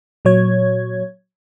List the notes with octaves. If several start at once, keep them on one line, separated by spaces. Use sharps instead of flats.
A#2 F#3 C#5 G#6